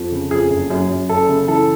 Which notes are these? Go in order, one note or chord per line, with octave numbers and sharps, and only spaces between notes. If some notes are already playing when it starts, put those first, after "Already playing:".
Already playing: F2
C#3
F2 G#4
F#1
F#2
F#2
F#1 A4
C#3
E3 A4